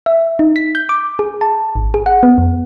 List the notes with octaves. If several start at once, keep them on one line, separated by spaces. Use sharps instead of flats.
E5
D#4
B6
G6
D6
G#4
A5
G#1
G#4
F#5
B3
F2